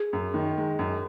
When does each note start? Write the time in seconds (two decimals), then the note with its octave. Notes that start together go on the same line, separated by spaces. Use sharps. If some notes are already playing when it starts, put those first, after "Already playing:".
Already playing: G#4
0.13 F#2
0.34 D#3
0.57 G#3
0.79 F#2